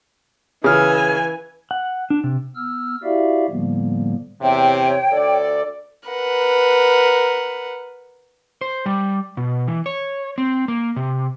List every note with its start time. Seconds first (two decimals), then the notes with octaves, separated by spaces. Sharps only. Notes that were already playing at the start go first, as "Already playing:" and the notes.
0.64 C#3 E3 G#5 F6
1.71 F#5
2.10 D4
2.24 C3
2.56 B3 E6 F6
3.03 E4 F#4 G4 D5 E5 F5
3.49 A2 D3 F3 G3 A#3 B3
4.41 E2 C3 C#5 G5
5.13 D2 A4 D5
6.08 A#4 B4 F#5
8.61 C5
8.86 G3
9.37 B2
9.67 E3
9.86 C#5
10.38 C4
10.68 A#3
10.96 C3